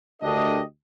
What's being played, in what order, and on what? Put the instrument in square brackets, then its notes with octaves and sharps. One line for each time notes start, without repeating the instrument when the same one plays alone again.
[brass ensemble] D2 A3 D4 G4 A#4 D#5